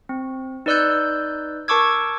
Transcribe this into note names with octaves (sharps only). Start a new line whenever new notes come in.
C4
D#4 B4 D5 E6 F#6 G6
A#4 A5 C#6 D6 E6 G#6